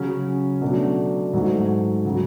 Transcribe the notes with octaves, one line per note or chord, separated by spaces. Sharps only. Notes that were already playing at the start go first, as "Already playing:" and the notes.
Already playing: C#3 F#3 C#4 G#4
B2 F#3 A3 D4
G#2 F#3 A3
C#3 F#3